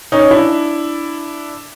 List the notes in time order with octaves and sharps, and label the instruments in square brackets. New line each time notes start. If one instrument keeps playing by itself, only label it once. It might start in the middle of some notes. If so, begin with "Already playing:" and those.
[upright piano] C#4 D#4
D4 E4